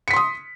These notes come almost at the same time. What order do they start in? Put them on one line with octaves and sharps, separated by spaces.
C#7 B6 C6 D#6